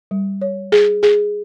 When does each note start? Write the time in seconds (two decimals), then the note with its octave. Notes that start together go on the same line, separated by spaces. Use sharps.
0.11 G3
0.42 C#5
0.72 G#4
1.03 G#4